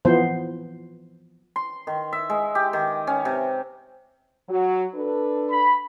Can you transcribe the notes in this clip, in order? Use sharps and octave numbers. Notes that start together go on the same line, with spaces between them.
E3 F3 B3 C5
C6
D#3
E5
G#3
G4
D#3
C#4
C3
F#3 F#4
D4 A4 B4
B5